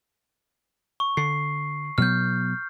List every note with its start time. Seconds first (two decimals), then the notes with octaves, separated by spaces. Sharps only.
1.00 C#6
1.17 D3 C7
1.98 B2 F#3 B3 F6 G6